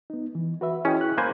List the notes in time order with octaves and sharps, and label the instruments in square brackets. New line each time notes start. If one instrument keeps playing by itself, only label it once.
[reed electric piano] B3 D#4
E3
F#4 B4 E5
[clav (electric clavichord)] C#4 [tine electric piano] E4 [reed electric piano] G#4 D#5 G5
[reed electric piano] F#6
[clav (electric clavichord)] A#3 C5 G#5 [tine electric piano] B5